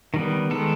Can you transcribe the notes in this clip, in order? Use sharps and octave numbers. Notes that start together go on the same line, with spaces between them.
D#3 G3 B3
D#3 G#3 B3 A4